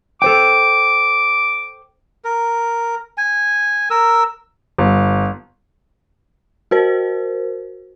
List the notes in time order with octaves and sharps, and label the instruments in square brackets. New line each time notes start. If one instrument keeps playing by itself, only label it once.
[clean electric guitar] A4 C5 G5 [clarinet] D6
[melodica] A#4
G#5
A#4 E6
[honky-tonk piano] G1
[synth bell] F#4 A#4 C5